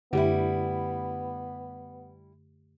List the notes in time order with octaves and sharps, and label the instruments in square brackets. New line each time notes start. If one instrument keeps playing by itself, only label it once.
[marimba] F#2 [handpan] D3 A3 G4 [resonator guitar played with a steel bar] G3 E4 [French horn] B3